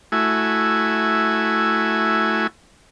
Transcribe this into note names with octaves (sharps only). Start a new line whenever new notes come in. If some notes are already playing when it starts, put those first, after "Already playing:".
A3 E4 F#4 G#5